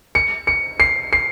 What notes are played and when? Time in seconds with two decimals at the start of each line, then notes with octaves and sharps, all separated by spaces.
0.15 C#7
0.47 C#7
0.80 C7
1.13 C7